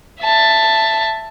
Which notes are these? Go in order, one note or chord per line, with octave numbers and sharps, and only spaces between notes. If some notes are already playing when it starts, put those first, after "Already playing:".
E5 A5